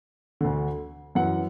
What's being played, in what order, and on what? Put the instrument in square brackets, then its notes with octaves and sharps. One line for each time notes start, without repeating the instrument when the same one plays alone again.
[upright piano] D2 D3
F#2 E3 F#5